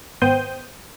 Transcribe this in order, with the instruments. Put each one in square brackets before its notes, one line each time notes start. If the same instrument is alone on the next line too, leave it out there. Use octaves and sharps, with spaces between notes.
[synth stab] G#1 B3 C5 G5 D#6 G6